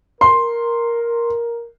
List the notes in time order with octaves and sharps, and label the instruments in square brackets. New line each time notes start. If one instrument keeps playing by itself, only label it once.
[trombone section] A#4 [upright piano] C6